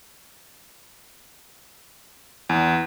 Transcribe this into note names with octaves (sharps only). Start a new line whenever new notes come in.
E2